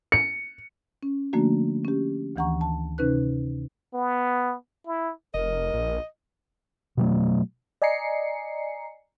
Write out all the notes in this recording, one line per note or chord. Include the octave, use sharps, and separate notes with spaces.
C#7
C#4
D3 F3 A3 A#3 D4 F#4
C#4 G4
D2 D#3 E3 F#5 A#5 C#6
A5
C3 C#4 D#4 B4 F#6
B3
E4
F1 A#4 D#5
A#1
B2 F#3 A3
D5 D#5 G#5 A#5 C7 C#7